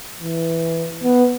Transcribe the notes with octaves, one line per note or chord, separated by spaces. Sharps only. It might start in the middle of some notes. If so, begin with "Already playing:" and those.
E3
B3